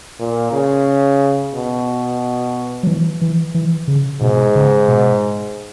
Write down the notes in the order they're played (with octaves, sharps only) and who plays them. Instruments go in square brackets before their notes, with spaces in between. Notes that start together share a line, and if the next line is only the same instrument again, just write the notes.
[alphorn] A#2
C#3
B2
[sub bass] F#3
E3
E3
E3
C#3
[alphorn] G#2 [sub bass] B2
[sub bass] C#3
B2